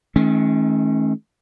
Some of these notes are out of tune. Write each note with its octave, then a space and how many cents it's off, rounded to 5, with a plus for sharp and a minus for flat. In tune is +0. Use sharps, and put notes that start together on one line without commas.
D#3 +30 A3 -35 C#4 -25